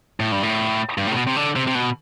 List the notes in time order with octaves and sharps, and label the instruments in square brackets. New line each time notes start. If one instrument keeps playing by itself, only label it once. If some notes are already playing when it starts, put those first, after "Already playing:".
[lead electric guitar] A2
G2
A2
G2
A2
C3
B2
C3
D3
C3
C3
B2